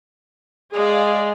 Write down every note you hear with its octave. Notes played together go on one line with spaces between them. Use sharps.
G#3 G#4 D5 F5